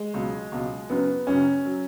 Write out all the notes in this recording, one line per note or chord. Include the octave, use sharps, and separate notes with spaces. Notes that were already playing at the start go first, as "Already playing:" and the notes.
Already playing: G#3
C#2 B2 F#3
C#2 B2 F#3
F#1 F#2 C#3 F#3 B3
F#1 F#2 C#3 F#3 C#4
F#3